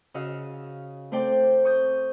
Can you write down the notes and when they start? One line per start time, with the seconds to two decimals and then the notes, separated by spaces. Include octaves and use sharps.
0.14 C#3 F#4 D#5 F5 E6
1.12 A3 C4 C5 D5 G5
1.65 C#6 D#6 G6